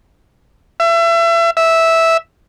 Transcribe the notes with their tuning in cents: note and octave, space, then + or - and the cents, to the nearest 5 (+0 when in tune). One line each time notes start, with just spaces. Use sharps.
E5 +30
E5 -10